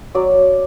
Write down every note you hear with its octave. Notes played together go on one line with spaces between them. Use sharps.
F#3 D5